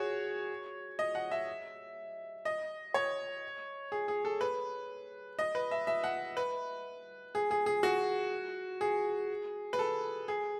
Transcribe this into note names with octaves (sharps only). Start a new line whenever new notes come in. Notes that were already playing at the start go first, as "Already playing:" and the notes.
Already playing: F#4 G#4 C#5
D#5
F#5
E5
D#5
C#5
G#4
G#4
A4
B4
D#5
B4
E5
E5
F#5
B4
G#4
G#4
G#4
F#4
G#4
B4
A4
G#4